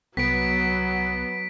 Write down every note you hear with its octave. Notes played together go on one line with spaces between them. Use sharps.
C2 F#3 B3 B6 D7